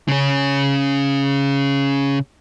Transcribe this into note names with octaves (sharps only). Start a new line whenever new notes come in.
C#3 C#4